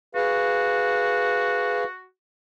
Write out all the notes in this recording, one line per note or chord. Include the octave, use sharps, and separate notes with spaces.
F#4 G#4 B4 F5